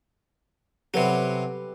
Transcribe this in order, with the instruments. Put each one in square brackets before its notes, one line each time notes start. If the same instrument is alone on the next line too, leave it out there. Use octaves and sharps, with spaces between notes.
[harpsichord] C3 F#3 [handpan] G4 A4 B4